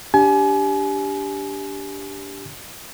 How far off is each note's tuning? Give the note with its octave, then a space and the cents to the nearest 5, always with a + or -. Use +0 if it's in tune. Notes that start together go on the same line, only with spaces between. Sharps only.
D4 -15 G4 +0 G#5 +35